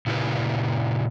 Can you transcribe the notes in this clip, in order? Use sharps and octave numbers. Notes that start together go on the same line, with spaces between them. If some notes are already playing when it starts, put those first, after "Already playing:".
A#2 C#3 E4 G4 A#4 B4